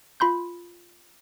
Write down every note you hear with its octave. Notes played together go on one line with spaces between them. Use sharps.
F4 B5 C6 G6